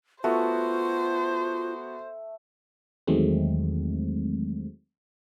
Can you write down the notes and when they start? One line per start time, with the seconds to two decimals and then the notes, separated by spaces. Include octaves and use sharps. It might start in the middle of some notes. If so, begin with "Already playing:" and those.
0.24 A3 B3 F4 F#4 C5
3.07 E2 D#3 F#3 G#3 A3 C4